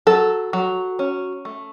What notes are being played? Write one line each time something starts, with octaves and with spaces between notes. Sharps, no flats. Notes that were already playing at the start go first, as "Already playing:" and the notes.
F#3 A4
F#3
C#4
A3